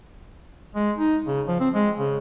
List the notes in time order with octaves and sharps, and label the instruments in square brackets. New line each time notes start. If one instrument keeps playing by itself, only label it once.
[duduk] G#3
D#4
C#3
F3
C4
G#3
C#3